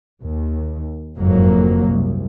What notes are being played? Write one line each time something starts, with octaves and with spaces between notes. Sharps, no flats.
D#2
F#1 F2 G#2 F#3 A#3
C2